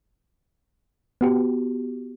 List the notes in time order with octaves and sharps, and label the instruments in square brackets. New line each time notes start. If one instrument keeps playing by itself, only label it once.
[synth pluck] B3 F#4 G4